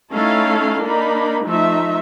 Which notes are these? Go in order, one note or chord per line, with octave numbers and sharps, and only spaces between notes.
A3 C#4 D#4 E4 A4 F5
A#3 D4 D#4 B5
F3 A3 D#4 E5